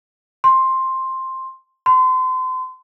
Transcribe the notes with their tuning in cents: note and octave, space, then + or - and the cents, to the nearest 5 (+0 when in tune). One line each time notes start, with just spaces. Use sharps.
C6 +10
C6 -35